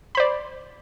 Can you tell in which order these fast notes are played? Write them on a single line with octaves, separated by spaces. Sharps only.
B5 C5 D5